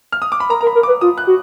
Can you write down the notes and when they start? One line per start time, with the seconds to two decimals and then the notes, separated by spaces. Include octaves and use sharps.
0.12 F6
0.22 D#6
0.32 D6
0.40 B5
0.49 A#4 A#5
0.61 A#4 A#5
0.67 B5
0.75 A#4
0.83 B4 D6
1.01 F4 D#6
1.18 F#6
1.27 F#4